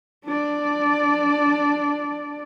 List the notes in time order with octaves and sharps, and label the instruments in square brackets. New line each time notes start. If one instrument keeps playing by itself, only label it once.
[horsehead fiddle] D4 D5